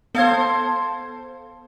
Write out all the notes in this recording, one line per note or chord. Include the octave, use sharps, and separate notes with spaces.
B3 A4 C5 F5 G#6